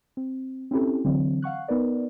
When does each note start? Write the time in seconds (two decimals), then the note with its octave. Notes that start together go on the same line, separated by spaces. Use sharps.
0.17 C4
0.71 C4 C#4 E4 G4 A4
1.05 D3 E3 F#3 C4
1.42 F5 F#5 C#6 F#6
1.68 B3 D#4 A#4 B4 D5